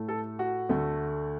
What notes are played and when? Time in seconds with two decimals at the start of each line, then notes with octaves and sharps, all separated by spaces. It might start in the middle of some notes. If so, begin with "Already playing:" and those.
Already playing: A2 A3
0.08 A4
0.39 F#4
0.69 D2 D3 A3